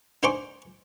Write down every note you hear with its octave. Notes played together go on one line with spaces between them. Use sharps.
D4 D#4 C5 G#5 C#6 D6